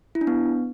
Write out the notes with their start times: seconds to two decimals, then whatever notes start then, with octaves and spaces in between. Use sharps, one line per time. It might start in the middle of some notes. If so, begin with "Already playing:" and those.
0.15 E4
0.21 D4
0.27 B3